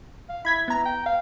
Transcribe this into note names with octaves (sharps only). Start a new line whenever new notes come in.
F5
E4 B5 G#6 B6
B3 A#5
G5
F5